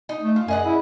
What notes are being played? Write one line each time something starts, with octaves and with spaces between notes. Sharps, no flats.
D#4
A3
F4
F#2 G#4 D#5 F#5
E4